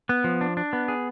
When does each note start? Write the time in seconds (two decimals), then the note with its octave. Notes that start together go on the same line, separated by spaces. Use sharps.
0.09 B3
0.24 F3
0.41 D4
0.57 D4
0.73 B3
0.88 G#4